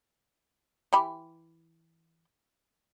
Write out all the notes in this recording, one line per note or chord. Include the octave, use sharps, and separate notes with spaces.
E3 G4 B5